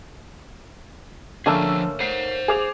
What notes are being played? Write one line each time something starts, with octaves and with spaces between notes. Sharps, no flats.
D3 F3 A3 A#3 C#4 G#4 A5 E6
C5 F#5 C7
G#4 D6 F7